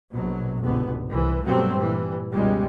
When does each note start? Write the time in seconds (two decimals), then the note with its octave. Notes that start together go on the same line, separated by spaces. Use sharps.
0.12 A#1 B2 F#3
0.62 F1 C#2 G#2 B2 D3 B3
1.06 C2 E3
1.43 G2 B2 F#3 G3 A3 C4
1.76 A#2 E3 G3
2.34 C#2 G2 B2 G3 G#3